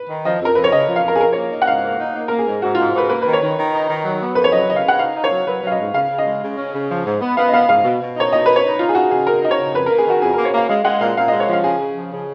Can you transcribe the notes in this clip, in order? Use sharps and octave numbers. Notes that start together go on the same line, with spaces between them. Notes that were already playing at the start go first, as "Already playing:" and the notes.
Already playing: B4
D#3
F3 D#5
F2 A#4
F2 B4
C#5
C#3 D#5
F3
F5
F2 A#4
G#4
F3 A#4
A#3 C#5
D#4
F#5
G#2 F5
A#3
D#4
A#3
A#3 A#4
G#4
G#2
G#2 F#4
G#2 F4
G#2 B4
A#3 B4
D#3 B4
C#5
D#3
D#3
D#4
D#3
F#3
B3
F2 B4
C#5
F#3 D#5
C#3 D#5
F5
C#3 F#5
D#4 F5
D#4
C#5
F#3
F#3 B4
F#3 F5
D#5
G#2
C#3 F5
C#3
D#5
G#3
C#3
C#4
C#3
F3
G#2
B3
B3 F5
D#5
B3 F5
G#2 F5
B2
B2
D#4 C#5
B2 D#5
D#4 B4
C#5
D#4
D#4 F4
G#4
D#4 F#4
C#3 G#4
D#4 A#4
D#4 D#5
C#5
C#3
F2 B4
A#3 A#4
G#4
D#3 F#4
F2 G#4
A#3 A#4
C#5
A#3 F5
G#3 F5
G#3 F#5
A#2 F5
A#2 F5
G#3 D#5
C#5
F3 F5
C#3 G#4
C#3
F3
C#3